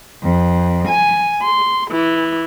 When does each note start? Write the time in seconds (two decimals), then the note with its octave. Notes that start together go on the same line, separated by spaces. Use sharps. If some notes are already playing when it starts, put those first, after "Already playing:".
0.23 F2
0.89 G#5
1.43 C6
1.90 E3